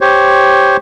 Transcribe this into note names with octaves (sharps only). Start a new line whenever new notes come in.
G4 C5 C#5